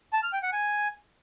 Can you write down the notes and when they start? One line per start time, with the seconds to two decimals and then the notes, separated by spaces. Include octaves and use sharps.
0.13 A5
0.23 F6
0.33 G5
0.43 F#5
0.53 G#5